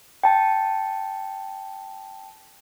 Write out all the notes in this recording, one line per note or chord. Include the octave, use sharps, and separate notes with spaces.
G5 A5